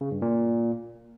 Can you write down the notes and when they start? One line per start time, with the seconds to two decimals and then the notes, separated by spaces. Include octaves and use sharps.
0.01 C#3
0.11 G2
0.22 A#2